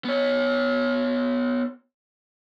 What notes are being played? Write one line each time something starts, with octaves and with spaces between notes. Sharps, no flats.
B3 C#5